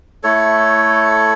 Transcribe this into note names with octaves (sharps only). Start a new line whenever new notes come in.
A3 E4 A4 C#5